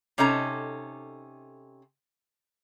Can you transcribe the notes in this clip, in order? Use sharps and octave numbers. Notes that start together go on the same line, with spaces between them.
C3 C#4 D#4 A4 A#5